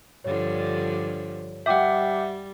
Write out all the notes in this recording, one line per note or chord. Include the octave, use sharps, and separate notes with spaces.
G2 D3 F3 C#5
G3 E5 F#5 G5 D6 G6